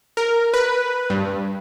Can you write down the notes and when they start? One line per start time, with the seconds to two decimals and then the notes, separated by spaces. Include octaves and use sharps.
0.17 A#4
0.54 B4
1.10 G2